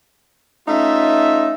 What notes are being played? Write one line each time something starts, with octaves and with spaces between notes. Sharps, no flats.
A3 C#4 D#4 F4 E5